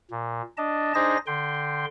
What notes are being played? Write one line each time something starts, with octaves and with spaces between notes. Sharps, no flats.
A#2
D4 D#5 A5
D4 D#4 G#4 C5 D#5 A#6
D3 G5 C6